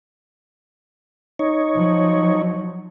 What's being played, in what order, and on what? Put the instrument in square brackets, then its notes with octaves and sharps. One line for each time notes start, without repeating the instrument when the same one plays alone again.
[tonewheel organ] D#4 C#5
[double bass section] F3 F#3